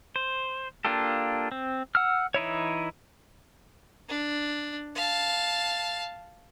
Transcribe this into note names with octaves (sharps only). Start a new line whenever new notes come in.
C5
A#3 D4 F4 G4 A4
C4
F#5 E6 F6
E3 D#4 E4 C#5
D4
F5 A5